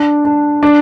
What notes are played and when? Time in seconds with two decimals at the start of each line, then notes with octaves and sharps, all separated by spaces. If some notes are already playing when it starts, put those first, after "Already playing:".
Already playing: D4
0.25 D4
0.63 D4